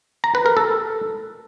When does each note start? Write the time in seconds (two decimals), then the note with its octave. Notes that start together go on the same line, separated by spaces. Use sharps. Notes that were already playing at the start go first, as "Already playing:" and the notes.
0.24 A#5
0.35 B4
0.46 A#4
0.57 A4